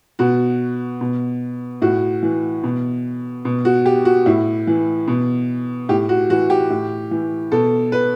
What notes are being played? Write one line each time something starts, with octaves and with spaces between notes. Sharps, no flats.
B2 F#4
B2
A2 F#4
E3
B2
B2
F#4
G4
F#4
A2 E4
E3
B2
A2 G4
F#4
E3 F#4
G4
A2
E3
B2 A4
B4